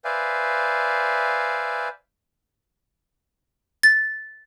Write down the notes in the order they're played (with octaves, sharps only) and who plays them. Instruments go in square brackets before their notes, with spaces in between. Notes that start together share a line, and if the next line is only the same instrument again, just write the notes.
[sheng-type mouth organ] B4 C5 D5 E5 F5 G#5
[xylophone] A6